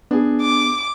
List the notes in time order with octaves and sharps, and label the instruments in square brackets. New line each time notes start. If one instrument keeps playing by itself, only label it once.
[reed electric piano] B3 [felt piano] D4 G#4
[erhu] D6